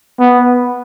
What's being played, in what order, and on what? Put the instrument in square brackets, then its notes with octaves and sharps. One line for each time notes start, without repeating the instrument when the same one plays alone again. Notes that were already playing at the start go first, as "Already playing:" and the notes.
[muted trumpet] B3